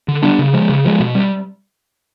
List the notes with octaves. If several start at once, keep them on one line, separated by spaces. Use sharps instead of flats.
D3
G3 B3 D4
C#3
F3 G#3
C#3
F3 G#3
B2
G3